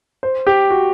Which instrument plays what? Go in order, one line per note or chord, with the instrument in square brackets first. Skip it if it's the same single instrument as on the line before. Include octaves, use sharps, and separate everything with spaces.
[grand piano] C5
G4
F#4